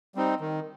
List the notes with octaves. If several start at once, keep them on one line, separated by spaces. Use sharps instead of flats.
G3 C4 D#4
D#3